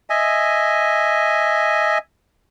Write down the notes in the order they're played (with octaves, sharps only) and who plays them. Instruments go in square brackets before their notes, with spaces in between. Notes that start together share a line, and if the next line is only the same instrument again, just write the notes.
[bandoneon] D#5 E5 G#5